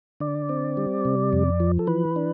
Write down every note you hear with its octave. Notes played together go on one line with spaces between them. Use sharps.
D3 D5
C4
G3
C3
F2
F3
A4
E3 B4
D4